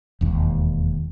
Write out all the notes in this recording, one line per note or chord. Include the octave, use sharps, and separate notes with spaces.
E1 D#2